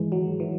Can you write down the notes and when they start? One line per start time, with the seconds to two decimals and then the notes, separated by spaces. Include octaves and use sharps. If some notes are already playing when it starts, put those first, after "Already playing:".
Already playing: G#2 D#3 E3 G#3
0.12 F#3
0.40 D#3 E3